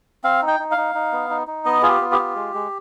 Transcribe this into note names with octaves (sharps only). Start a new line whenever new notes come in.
C4 F5
D#4
G5
D#4
F5
D#4
D#4
B3
D#4
D#4
B3 D#5
F4 G#4
G4
B3
G4
F4
G#3
G#3